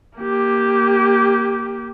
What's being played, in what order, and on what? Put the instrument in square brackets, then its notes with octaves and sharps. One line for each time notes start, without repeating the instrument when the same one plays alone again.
[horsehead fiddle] A#3 G4